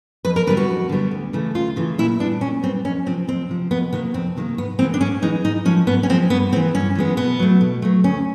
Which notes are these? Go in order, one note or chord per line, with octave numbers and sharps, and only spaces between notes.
F2 B4
A#4
D3 G3 B3 B4
F#4
F2
D3 G3 B3
D2
C#3 E3 A3
D2 F4
C#3 E3 A3
A#2 E4
G3 B3 D4
A#2 C#4
G3 B3 C4
F2 C#4
C3 F3 C4
F2 C4
C3 F3
F2 B3
C3 D#3 G3 A#3 B3
F2 C4
C3 D#3 G3 A#3
G#2 B3
E3 G#3 B3 C4
D4
G#2 C#4
E3 G#3 B3 D#4
G#2 D#4
F3 G#3 C#4
G#2 B3
C#4
F3 G#3 C4
G2 B3
E3 G#3 B3 C4
G2 C#4
E3 G#3 B3
B2 B3
F#3 A3
B2
F#3 A3
D2 C#4